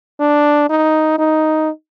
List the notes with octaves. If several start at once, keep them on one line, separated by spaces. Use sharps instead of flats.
D4
D#4
D#4